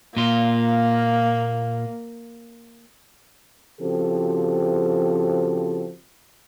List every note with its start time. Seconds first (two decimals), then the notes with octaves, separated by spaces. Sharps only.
0.17 A#2 A#3 F4
3.81 C#3 F3 C4 F#4 G4 A4